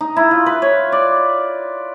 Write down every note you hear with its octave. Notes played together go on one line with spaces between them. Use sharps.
D#4
E4
F4
B4
C#5
D5